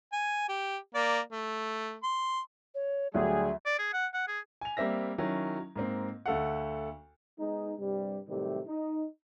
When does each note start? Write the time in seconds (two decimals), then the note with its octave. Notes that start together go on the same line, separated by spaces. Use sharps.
0.13 G#5
0.49 G4
0.95 A#3 D5
1.32 A3
2.03 C6
2.75 C#5
3.14 D2 D3 F#3 G3 G#4 E5
3.66 D5
3.79 G#4
3.93 F#5
4.14 F#5
4.28 G#4
4.61 G#5 F7
4.77 G3 A#3 C4 E5 A#6
5.18 D#3 F#3 C#4 E4
5.76 G#2 A#3 C4
6.26 D2 A3 A4 F5 F#5
7.38 G#3 B3 D#4
7.79 G2 C3 G3
8.27 A2 C3 D#3 F#3 G3
8.67 D#4